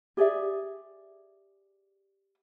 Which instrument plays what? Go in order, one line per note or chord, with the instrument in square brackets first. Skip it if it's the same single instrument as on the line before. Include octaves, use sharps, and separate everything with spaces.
[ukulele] G4 G#4 D5 E5